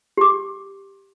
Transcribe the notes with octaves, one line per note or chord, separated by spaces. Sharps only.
G4 D6